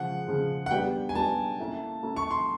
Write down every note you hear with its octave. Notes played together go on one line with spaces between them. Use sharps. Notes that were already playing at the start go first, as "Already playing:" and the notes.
Already playing: C#3 F3 G#3 F#5
C#3 F3 G#3
F#5
G3 B3 D4 G4 G5
G#5
G3 B3 D4 G4 A5
A#3 C#4 E4 A4
A#3 C#4 E4 A4
C#6
C6